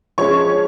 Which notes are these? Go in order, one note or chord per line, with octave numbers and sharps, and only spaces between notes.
F3 G#3 C#4 C#5 C#6